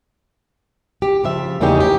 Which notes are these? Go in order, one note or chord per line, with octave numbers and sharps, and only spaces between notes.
G4
C#3 F3 E5
E2 C#3 A#3 C#4 D#4 G4
G4